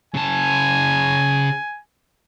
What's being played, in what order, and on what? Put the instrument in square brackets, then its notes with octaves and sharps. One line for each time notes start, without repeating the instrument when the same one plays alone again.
[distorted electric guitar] C#3 A5 [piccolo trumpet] G#5